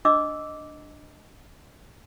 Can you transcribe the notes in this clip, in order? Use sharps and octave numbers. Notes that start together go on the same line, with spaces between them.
D4 D#5 D6 E6